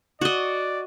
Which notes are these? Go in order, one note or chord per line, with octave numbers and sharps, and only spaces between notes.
F#4 D5 D#5